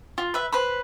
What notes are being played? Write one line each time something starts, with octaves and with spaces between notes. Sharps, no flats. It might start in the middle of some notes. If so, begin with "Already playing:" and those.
F4
B4 E5
B4 C5 B5